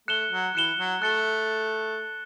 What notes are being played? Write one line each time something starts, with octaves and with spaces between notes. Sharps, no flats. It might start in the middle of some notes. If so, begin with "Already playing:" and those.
A3 F#6 C#7 E7 G7
F#3
E3 F#6 C#7 E7 G7
F#3
A3 F#6 A6 C#7 G7